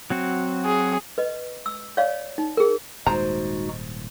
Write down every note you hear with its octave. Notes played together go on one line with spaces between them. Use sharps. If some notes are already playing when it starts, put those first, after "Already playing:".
F#3 C4 F#4
G#4
B4 D#5
E6
C#5 D5 F5
D#4
G#4 A#4
D#1 G#2 G#3 D#4 F#4 C5 A#5